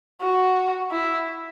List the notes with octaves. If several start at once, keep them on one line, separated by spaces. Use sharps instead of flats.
F#4
E4